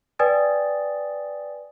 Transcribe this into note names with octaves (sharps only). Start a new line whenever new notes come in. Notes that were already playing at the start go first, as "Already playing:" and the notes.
B4 D5 G5 G#5 D#6 A6